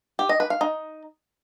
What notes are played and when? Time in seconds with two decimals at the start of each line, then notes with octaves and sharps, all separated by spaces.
0.19 G4
0.29 D#5
0.40 B4
0.50 F5
0.61 D#4